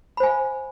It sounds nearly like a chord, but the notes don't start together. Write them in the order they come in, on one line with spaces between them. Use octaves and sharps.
B5 C5 G#5 F5